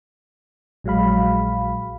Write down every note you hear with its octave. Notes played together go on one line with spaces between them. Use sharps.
A#1 F#3 G#3 F5 B5